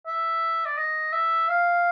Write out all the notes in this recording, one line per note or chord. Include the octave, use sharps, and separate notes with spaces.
E5
D5
D#5
E5
F5